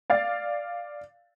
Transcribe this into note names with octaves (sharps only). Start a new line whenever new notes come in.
D5 F5 A6